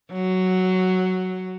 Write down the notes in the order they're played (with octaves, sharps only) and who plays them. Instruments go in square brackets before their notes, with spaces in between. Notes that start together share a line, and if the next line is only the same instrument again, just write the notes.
[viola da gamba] F#3